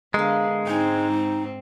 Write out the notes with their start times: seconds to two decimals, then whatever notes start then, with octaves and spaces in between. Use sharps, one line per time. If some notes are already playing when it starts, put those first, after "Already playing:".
0.14 D3 G#3 B3 A#4 F5
0.67 G#2 C4 D#4 G5 G#5